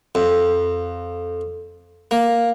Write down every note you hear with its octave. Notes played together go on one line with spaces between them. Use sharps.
F2
A#3